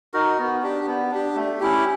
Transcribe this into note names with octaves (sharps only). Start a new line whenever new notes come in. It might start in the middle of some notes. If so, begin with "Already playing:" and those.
D#4 F#4 A#4
B3
D4 G4
B3
D4 G4
A3
C#4 E4 G4